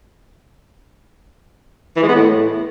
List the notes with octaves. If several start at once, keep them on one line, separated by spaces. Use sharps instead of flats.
E3
G#3
B3
A2